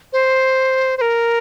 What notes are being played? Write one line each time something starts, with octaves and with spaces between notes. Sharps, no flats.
C5
C5
A#4